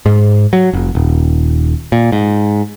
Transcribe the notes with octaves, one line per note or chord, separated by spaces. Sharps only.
G#2
F#3
F1
D#1
A#2
G#2